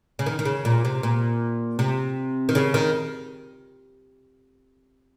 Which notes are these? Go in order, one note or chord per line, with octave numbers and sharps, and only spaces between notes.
C#3
D#3
D#3
C#3
A#2
C3
A#2
C3
D#3
C#3
D#3